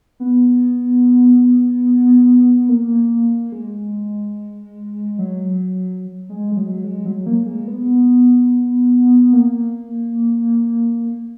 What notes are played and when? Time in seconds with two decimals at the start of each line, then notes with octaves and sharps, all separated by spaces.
0.20 B3
2.69 A#3
3.52 G#3
5.19 F#3
6.29 G#3
6.52 G#3
6.57 F#3
6.84 G#3
7.05 F#3
7.26 A#3
7.46 G#3
7.68 B3
9.33 A#3